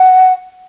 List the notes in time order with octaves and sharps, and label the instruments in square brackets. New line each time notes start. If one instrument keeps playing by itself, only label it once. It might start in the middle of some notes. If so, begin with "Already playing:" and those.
Already playing: [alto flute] F#5